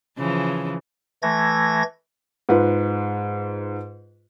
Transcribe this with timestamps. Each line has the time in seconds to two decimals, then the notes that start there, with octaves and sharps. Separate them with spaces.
0.18 C#3 E3 F3
1.22 E3 A3 G#6 A#6
2.49 G#2 F4 B4